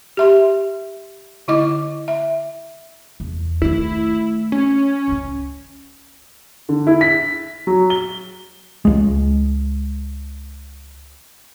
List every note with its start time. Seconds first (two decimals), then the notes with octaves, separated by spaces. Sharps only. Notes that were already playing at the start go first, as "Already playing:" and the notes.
0.17 G4 E5 C6
1.48 D3 E4 D#5 D6
2.08 E5
3.20 E2
3.62 D#3 A3 E4
4.52 C#4
5.08 C#2 C#3
6.69 D3
6.87 E4
7.01 B6
7.67 F#3
7.90 G7
8.85 C#2 G#3